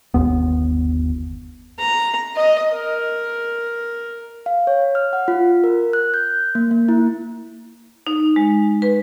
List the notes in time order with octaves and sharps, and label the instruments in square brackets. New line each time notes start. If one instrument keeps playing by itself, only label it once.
[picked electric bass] G1 D#2 B3
[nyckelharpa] A#5
D#5
A#4
[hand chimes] F5
C#5
F6
F#5
F4
A#4
F#6
G6
A#3
A#3
E4
[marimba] D#4
G#3
B4